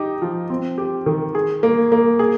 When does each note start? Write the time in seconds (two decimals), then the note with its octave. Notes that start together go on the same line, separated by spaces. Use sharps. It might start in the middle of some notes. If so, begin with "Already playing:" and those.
Already playing: D#4 G4
0.22 F3
0.50 C4
0.78 G4
1.06 D#3
1.35 G#4
1.63 A#3
1.92 A#3
2.19 G#4